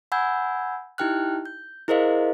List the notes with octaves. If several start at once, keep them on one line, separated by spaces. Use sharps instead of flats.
F#5 G#5 B5 E6 G6 G#6
D#4 E4 G4 G5 F6 F#6
G6
E4 G#4 A#4 C5 D#5 F5